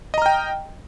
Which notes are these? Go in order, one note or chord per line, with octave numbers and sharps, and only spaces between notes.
D#5 G5 A#5 F6